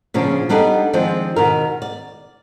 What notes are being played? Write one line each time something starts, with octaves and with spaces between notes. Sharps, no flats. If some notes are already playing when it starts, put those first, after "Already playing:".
A#2 C#3 F3 D4
G3 B3 D4 D#4 A4 D5
D#3 F3 G#3 C4 D4
B2 D#3 A#4
D5